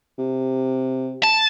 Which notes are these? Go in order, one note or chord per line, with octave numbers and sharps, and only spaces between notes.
C3
A5